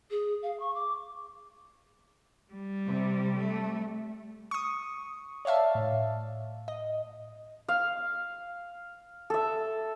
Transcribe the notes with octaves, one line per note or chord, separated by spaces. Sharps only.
G#4
F5
C#6
D6
G3
C3
A3
C#6 D#6
C#5 D5 E5 F5 A5
A2
D#5
F5
A4 E5